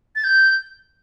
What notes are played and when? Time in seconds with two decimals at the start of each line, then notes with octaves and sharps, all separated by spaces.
0.15 A6
0.24 G6